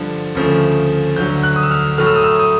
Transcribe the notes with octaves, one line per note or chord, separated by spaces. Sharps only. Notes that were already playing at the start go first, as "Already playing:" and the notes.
Already playing: G2 D3 F3
D2 C#3 F3 A3
D2 D3 F#3 G6
F#6
D#6
E6
F6
A2 F#3 A3 F6
E6
D#6
E6
D#6